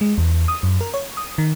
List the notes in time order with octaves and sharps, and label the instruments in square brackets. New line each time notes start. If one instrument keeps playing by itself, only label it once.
[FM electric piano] G#3
E2
D#6
F#2
A#4
C#5
D#6
D#3